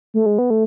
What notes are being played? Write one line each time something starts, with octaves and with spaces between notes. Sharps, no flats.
A3
G#3
B3
A3